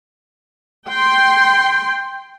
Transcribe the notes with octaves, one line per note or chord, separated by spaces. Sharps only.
G5 C6